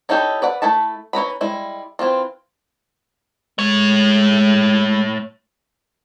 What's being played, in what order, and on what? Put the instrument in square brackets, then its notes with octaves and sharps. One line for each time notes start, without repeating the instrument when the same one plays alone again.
[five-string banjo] C#4 D#4 E4 G4 A4
B4 D5 F#5
A3 E4 A4 A5
E3 C#4 A#5 B5
G3 G#3 E4
E3 C4 E4 F4
[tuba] G#3 [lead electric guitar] A3 C#5